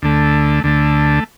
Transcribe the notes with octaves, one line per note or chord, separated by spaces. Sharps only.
D2 D3 A3
D2 D3 A3